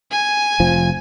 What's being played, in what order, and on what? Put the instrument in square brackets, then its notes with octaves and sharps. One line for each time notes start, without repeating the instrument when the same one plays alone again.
[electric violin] G#5
[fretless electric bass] F1 F3